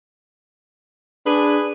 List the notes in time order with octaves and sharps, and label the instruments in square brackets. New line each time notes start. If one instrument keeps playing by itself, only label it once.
[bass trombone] D4 [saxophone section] G#4 B4